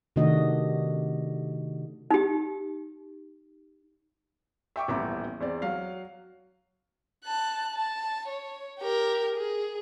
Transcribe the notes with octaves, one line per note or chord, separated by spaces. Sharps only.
C3 D#3 A3 D4 F#4 D#5
D#4 G4
E5 G5 C#6 D6
D#1 A1 B3 E5 A#5 D6
E2 C4 D5
F#3 F5
A5 F#6
A5
C#5
G4 A#4
G#4